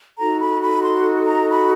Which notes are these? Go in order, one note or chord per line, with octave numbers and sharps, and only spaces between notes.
D#4 F#4 A4 A#5
B5
B5
C6
A#5
B5